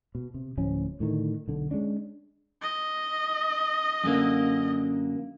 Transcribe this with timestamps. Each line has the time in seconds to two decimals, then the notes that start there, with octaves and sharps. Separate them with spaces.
0.15 B2
0.34 C3
0.57 D1 A2 F3 C#4
1.00 A2 D3 D#3
1.48 B1 D3
1.71 G#3 C#4 D4
2.62 D#5
4.04 F#2 D3 A#3